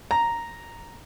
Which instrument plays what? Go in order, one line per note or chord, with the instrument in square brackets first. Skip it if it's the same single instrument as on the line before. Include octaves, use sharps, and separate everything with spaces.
[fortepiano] A#5